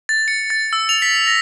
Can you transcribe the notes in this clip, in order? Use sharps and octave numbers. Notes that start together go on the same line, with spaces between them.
A6
C#7
A6
E6
F7
B6
A#6